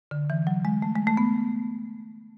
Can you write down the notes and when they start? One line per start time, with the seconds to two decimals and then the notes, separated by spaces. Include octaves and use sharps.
0.11 D3
0.30 E3
0.47 F#3
0.65 G#3
0.82 A3
0.96 G#3
1.07 A3
1.17 B3